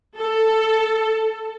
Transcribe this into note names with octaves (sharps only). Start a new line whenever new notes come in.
A4